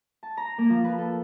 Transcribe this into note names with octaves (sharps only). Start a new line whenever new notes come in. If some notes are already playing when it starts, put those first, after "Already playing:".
A5
A#5
A#3
F3
B4
A4